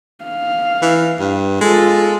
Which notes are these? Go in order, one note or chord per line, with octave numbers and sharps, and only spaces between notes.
F5
E3
G2
G#3 F4 A4